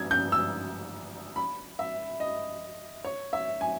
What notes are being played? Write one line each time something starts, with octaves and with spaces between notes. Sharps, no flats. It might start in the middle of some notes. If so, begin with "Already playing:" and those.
Already playing: G#6
G6
E6
B5
E5
D#5
C#5
E5
G#5